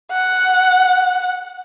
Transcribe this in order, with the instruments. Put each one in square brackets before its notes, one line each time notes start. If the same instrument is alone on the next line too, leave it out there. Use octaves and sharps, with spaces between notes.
[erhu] F#5